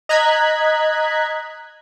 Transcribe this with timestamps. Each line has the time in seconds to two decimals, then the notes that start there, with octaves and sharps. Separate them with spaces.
0.09 D#5 A#5 F#6 G#6 B6